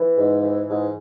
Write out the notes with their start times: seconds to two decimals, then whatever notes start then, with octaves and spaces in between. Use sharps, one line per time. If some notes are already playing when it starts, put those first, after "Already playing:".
Already playing: E3
0.17 G#2
0.43 E3
0.68 G#2